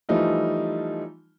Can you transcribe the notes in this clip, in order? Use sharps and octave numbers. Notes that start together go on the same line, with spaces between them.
E3 F3 G3 A3 D#4 F4